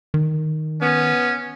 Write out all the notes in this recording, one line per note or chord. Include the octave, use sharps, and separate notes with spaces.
D#3
B3 C#4